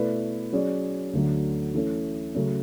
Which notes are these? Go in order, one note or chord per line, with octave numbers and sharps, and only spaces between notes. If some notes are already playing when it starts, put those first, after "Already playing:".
Already playing: B2 A3 E4 B4 D5
F#3 C#4 G#4 D5
D2 D3 F#3
E3 A3 C#4
C#3 F#3 A3 C#4